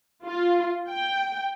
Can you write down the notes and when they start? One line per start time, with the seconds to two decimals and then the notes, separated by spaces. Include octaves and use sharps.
0.25 F4
0.89 G5